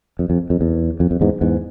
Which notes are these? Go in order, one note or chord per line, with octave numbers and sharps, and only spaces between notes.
F2
F2
F2
E2
F2
F2
E2 G#2
E2 G#2